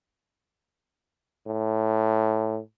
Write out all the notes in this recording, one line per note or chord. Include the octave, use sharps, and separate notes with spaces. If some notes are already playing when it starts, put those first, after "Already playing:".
A2